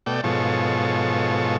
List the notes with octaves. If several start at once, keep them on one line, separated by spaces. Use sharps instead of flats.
B2 A3 D5 G5
G#2 B2 F3 A4 C#5